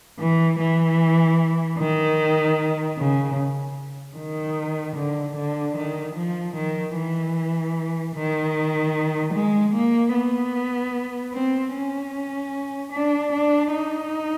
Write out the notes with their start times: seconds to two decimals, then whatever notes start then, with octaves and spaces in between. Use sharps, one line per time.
0.19 E3
0.58 E3
1.78 D#3
2.98 C#3
4.16 D#3
4.96 D3
5.36 D3
5.76 D#3
6.15 F3
6.56 D#3
6.96 E3
8.15 D#3
9.33 G#3
9.74 A#3
10.14 B3
11.33 C4
11.73 C#4
12.92 D4
13.32 D4
13.72 D#4